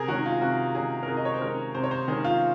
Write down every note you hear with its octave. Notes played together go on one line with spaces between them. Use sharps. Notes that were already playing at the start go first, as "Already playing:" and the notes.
Already playing: C3 G#4 A#4
D#3 G#3 C#4 F#4
F4
C3 F#4
D#3 G#3 C#4 G#4
A#4
C3 G#4
D#5
C#5
C5
D#3 G#3 C#4 A#4
C3 C5
C#5
C5
D#3 G#3 C#4 G#4
F4